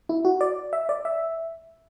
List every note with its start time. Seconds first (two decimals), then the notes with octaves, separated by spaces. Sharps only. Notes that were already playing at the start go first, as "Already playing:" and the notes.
0.09 E4
0.25 F#4
0.41 D5
0.73 E5
0.89 D5
1.05 E5